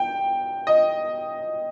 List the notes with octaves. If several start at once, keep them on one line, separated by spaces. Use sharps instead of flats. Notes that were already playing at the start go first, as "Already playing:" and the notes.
Already playing: G5
D#5